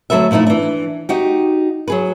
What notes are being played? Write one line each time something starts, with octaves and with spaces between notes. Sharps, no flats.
D2 F#3 A4 B4 E5
A#2 F3 A3 D#4 E4
E3 D4
D#4 F#4 G4
F#3 G#4 B4